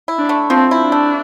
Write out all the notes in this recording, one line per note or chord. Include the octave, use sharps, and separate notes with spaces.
E4
D4
A3
F3 C4
E4
D4
A3